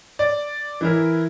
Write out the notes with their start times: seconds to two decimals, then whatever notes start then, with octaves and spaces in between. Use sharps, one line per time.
0.19 D5
0.81 E3 E4 A#4